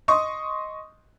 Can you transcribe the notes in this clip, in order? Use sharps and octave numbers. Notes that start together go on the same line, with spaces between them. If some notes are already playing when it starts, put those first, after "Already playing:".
D#5 C6 C#6 D#6